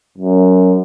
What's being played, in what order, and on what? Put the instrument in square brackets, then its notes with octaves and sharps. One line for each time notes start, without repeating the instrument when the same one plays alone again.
[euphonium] F#2